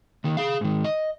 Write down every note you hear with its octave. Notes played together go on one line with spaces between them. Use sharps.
D#2 D#3
G#4 F5
G#2 D#3
D#5